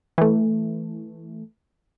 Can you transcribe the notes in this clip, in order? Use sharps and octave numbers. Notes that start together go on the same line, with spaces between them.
E3 A3